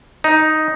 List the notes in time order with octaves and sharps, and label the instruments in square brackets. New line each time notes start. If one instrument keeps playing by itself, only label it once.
[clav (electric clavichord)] D#4